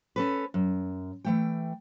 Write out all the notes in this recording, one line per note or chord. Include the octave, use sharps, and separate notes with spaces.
C#4 A4 B4
F#2
E3 A3 G5